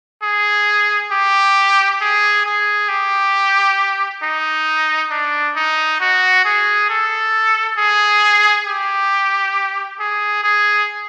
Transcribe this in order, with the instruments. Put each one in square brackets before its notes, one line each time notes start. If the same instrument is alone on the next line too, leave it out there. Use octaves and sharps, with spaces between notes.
[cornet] G#4
G4
G#4
G#4
G4
D#4
D4
D#4
F#4
G#4
A4
G#4
G4
G#4
G#4